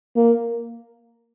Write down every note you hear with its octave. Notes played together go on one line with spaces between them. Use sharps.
A#3